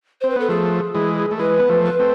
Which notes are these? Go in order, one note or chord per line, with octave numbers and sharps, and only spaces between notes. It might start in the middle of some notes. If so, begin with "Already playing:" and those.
C4 C5
B4
B3 A4
F3 A3 G#4
E3 G#3
A3
E3 G#3 B4
B3
F3 A3
B4
A3 C4